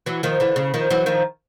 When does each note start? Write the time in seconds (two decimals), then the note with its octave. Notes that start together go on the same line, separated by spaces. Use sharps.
0.06 E3 F#3
0.23 D#3 F3
0.40 D3 E3
0.56 C#3
0.74 D#3 F3
0.90 E3 F#3
1.06 D#3 F3